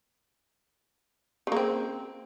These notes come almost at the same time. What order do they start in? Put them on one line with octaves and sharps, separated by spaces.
C#3 A#3 C4